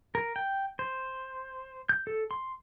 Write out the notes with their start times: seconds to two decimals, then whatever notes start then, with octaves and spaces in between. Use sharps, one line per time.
0.15 A#4
0.36 G5
0.79 C5
1.89 G6
2.07 A4
2.31 C6